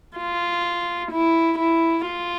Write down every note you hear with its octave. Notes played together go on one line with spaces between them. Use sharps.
F4
E4
E4
F4